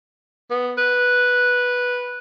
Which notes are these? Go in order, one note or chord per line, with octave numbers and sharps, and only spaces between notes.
B3
B4